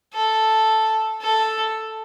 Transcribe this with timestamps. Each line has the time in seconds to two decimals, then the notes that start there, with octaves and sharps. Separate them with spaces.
0.14 A4
1.22 A4